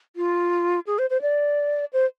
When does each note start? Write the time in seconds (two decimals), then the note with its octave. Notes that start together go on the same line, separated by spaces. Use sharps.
0.16 F4
0.87 G#4
0.99 C5
1.10 C5
1.22 D5
1.93 C5